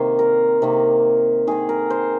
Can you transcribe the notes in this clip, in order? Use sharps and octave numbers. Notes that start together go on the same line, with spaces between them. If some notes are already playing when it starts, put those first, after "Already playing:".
Already playing: C3 D#3 A#3 C5
A#4
C3 D#3 A#3
D#3 C4 G#4
A#4
C5